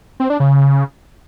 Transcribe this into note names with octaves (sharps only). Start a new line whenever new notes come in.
C4
D4
C#3